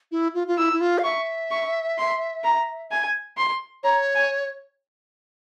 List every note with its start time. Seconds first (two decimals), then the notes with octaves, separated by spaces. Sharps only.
0.12 E4
0.34 F4
0.47 F4
0.58 E4 E6
0.73 E4
0.81 F4
0.98 F5
1.04 E5 C#6
1.51 C#6
1.98 C6
2.44 A#5
2.91 G#5
3.37 C6
3.83 C#5 A#5
4.15 G#5